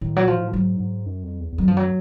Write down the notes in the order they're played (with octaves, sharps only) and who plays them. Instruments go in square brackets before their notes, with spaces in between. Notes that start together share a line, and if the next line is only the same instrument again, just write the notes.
[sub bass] A2 [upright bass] D#3
[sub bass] A#2 [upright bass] F#3
[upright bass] F3
[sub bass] A2
[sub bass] G#2 [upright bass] F#3
[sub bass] G#2
F#2
F2
E2
E2
[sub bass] F2 [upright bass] F#3
[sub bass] G2 [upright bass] F3
[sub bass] F#2 [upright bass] F#3